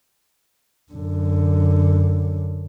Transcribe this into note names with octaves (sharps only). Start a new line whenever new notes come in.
F#2 D3